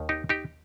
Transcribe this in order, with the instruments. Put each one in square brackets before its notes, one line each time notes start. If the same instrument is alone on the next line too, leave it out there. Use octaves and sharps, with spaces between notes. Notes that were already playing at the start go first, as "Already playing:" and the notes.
Already playing: [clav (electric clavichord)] D#2 D#3
D#4 G4
D#4 G4